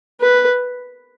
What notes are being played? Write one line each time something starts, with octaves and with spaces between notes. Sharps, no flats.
B4